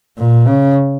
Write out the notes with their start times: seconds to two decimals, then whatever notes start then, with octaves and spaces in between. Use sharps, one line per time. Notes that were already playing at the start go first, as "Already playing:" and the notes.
0.18 A#2
0.47 C#3